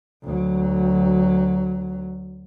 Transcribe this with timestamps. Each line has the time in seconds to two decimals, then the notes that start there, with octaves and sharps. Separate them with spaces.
0.24 D2 F#3